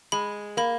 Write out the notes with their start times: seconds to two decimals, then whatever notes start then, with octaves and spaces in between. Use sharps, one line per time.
0.12 G#3 B5
0.57 A#3 B5